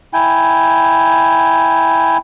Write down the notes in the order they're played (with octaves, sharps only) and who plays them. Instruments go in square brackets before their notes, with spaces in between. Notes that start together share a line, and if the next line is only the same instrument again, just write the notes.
[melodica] E4 G5 G#5